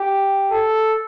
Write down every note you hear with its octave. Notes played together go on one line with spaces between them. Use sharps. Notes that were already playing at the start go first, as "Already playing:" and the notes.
Already playing: G4
A4